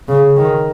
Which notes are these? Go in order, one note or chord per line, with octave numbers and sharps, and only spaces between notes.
C#3
D#3